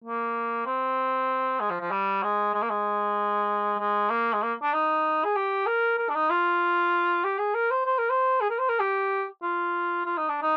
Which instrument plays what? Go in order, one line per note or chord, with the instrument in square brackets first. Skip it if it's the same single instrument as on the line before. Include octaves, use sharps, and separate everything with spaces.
[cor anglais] A#3
C4
G#3
F3
F3
G3
G#3
G#3
A#3
G#3
G#3
A#3
G#3
A#3
D4
D#4
G#4
G4
A#4
A#4
D4
D#4
F4
G4
G#4
A#4
C5
C5
A#4
C5
G#4
A#4
C5
A#4
G4
F4
F4
D#4
D4
D#4